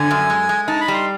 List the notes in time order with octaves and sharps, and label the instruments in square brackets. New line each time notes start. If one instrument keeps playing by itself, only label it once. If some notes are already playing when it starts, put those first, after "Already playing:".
Already playing: [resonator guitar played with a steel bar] D3 [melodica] G#5
[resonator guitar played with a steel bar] F#2
G#3
G#3
[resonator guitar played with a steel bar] D#4 [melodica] A5
[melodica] B5
[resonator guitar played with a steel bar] G3
[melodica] C6